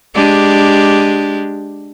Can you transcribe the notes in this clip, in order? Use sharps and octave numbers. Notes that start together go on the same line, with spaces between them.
G#3 D4 G4